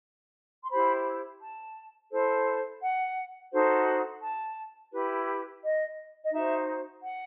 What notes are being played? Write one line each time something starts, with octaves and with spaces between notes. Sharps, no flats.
C6
E4 G4 C5 B5
A5
E4 A4 C5
F#5
D#4 F#4 A4 C5
A5
E4 G4 B4
D#5
D#5
D#4 F#4 C5 E5
F#5